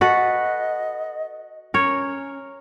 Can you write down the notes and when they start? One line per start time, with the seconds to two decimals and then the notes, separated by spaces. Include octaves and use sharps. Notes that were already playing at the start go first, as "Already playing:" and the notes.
0.01 F#4 A4 B4 D#5
1.74 C#4 A#4 C#5